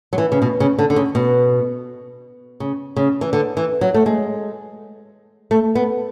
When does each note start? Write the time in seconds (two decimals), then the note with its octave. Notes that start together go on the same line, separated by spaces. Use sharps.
0.13 F#3
0.18 E3
0.32 C#3
0.42 B2
0.60 C#3
0.79 D3
0.90 D3
0.96 C#3
1.15 B2
2.60 C#3
2.96 C#3
3.21 E3
3.33 D3
3.57 E3
3.81 F#3
3.94 A3
4.06 G#3
5.51 A3
5.75 B3